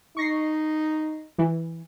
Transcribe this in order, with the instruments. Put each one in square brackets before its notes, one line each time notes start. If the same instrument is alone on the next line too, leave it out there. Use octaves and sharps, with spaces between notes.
[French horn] D#4 [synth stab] C#6 A#6 C7
[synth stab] E3